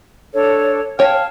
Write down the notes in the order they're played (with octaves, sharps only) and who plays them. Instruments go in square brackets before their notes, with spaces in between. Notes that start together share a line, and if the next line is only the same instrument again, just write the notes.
[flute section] D4 A4 C#5
[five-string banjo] C#5 G5 [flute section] F5 A5 F6